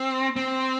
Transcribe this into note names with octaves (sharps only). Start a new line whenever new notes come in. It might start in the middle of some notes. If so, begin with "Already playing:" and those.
Already playing: C4
C4